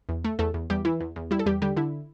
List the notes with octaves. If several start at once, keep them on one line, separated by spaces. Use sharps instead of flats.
E2
A3
E2 A3 A4
E2
E2 G3 G4
E3 E4
E2
E2
G3 E4
A4
E2 G3 G4
D3 G3 G4
D3 E4